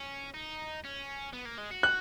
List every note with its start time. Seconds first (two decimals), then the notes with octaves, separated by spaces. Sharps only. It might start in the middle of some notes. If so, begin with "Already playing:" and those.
Already playing: C#4
0.34 D#4
0.84 C#4
1.33 B3
1.46 A#3
1.58 G#3
1.71 F#4
1.83 F#6